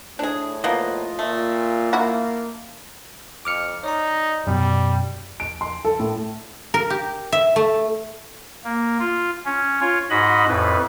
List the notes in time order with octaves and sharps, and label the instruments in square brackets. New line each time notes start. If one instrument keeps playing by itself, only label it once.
[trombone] A2 [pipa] D4 G#4
[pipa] F3 A#3 B3 [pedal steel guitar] F4 D#5
[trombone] A#2 [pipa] A3
[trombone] A#3 [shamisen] E4 F#4
[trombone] F2 [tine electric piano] D6 F6 C#7
[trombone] D#4 [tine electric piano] C#5 D5 A#5
[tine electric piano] F#2 B2 [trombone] G3
[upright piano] D7
C6
A4
A2
[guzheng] A#4
G4
E5
A3
[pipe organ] A#3
F4
C#4
F4 C#5
G#2 F#4 D#5 B5
F2 A2 B4